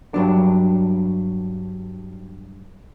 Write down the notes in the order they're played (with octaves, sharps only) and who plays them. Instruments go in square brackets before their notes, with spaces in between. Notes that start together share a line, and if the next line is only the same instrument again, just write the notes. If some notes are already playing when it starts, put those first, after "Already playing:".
[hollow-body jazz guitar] G2 F#3 D4